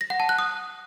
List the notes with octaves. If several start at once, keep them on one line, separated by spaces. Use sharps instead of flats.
A#6
F#5
A5
F#6
D#6